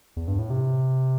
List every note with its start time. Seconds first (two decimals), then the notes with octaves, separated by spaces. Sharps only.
0.17 E2
0.28 G2
0.39 A2
0.50 C3